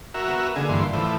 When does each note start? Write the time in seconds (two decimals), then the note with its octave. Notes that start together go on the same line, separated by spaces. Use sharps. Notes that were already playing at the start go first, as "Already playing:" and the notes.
0.14 F#4 A#4 E5
0.28 B3
0.56 D3 A3 A#3 G#4
0.69 G2 E3 C6
0.93 A2 E3 F3